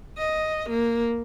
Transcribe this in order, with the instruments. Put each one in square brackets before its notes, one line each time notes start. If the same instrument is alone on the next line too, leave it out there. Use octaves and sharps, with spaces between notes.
[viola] D#5
A#3